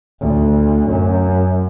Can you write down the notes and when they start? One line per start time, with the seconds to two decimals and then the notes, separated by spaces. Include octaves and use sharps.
0.21 D2
0.88 F#2